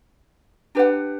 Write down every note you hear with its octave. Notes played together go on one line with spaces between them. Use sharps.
D4 G4 B4 F#5